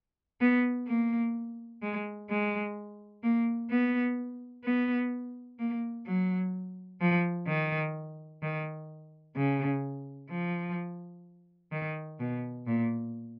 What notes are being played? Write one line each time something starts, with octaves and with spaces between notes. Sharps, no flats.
B3
A#3
G#3
G#3
A#3
B3
B3
A#3
F#3
F3
D#3
D#3
C#3
F3
D#3
B2
A#2